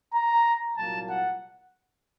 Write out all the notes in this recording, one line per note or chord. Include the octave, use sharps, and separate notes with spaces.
A#5
C2 A#2 F#3 A#3 A5
F#5